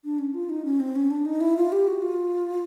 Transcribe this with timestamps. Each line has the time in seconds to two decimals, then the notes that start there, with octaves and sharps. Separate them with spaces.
0.05 D4
0.19 C#4
0.34 F4
0.50 D#4
0.65 C#4
0.80 C4
0.96 C#4
1.10 D4
1.25 D#4
1.41 E4
1.57 F4
1.72 G4
1.87 F#4
2.02 F4